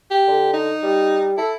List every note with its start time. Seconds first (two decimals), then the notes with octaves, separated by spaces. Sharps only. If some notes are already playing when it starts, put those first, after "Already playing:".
0.11 G4
0.27 D3
0.53 D#4
0.83 G3
1.37 E4 A4